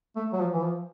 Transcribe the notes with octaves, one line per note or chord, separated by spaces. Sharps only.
A3
F#3
F3
E3
F3